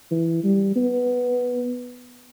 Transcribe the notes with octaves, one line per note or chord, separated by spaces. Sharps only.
E3
G3
B3